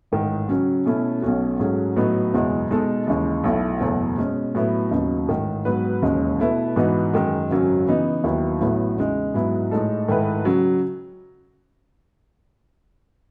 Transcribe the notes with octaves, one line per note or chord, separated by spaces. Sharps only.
A1 G#2 D#3
C#3 F#3 C#4
B2 A3 C#4 E4
B1 B2 A3 C#4 F#4
G#2 F#3 A3 C#4 G#4
A2 F#3 B3 D#4
F#1 E2 B2 G#3
B2 G#3 D#4 A4
D#2 C#3 E3 G#3
B1 B2 A3 E4
F#1 E2 B2 A3
B2 G#3 C#4
A2 F#3 B3 E4
D#2 C#3 F#3 B3 D#4
A1 G#2 D#3
G#2 F#3 B3 F#4 B4
E1 D#2 C#3 G#3 C#4
B2 A3 E4 B4
G#2 E3 B3 D#4 F#4
F#2 D#3 G#3
G#1 F#2 C#3 F#3 C#4
C#3 E3 B3 D#4
D#2 D#3 F#3 B3 E4
A1 A2 F#3 B3 E4
E2 C#3 G#3 D#4
G#2 F#3 B3 E4
A2 G#3 D#4 A4
G#2 D#3 A3 E4 B4
C#3 F#3